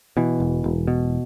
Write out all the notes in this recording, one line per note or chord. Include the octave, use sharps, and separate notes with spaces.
B2 E3
E1
E1
B2